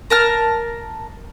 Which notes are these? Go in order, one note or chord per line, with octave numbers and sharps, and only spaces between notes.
A#4 A5 F6